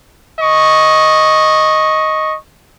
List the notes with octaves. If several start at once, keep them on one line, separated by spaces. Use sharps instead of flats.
D#5 C#6